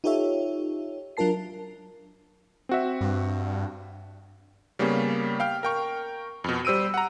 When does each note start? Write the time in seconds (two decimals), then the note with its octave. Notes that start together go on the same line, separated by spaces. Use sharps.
0.04 D#4 F4 G4 A4 C#5 E5
1.17 F#3 D4 F4 A#4 A5 C7
2.69 C4 F#4 E5
3.01 G2
4.79 C#3 G3 A#3 B3 C#4
5.40 F5 G5 F6
5.63 A#4 G5 C#6
6.44 F2 B2
6.65 G3 C5 E6 D7 D#7
6.94 F#5 A#5